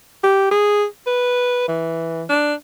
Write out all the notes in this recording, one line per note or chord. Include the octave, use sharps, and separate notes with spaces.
G4
G#4
B4
E3
D4